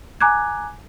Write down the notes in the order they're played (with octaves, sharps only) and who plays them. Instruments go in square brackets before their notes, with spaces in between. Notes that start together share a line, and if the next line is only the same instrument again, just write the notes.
[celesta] G#5 A#5 D6 F#6 G#6